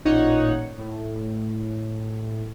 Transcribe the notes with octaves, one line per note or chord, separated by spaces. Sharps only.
A1 A#2 D#4 C#5 F#5
A2